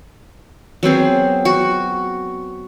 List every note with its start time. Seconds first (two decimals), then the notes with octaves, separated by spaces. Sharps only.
0.83 F#3 B3 C4 G#4
1.45 F#4